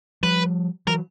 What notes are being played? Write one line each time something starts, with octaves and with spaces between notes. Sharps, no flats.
F3 G3 B4
E3 F#3 A#4